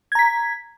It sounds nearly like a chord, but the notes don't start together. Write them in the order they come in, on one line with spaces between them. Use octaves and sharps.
G#6 A#5 B6